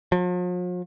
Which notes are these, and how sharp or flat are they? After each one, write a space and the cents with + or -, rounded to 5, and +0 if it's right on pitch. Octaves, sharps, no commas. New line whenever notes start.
F3 +45